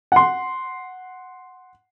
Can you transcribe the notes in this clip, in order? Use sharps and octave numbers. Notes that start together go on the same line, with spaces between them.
F#5 C6